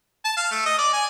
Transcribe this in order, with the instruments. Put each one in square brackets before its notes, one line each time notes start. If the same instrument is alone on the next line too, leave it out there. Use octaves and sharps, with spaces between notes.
[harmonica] A5
F5
A3
D#5
D5
G#5